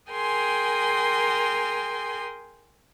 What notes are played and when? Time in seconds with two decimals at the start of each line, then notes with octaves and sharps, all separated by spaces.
0.11 G#4 A#4 G5 G#5 C6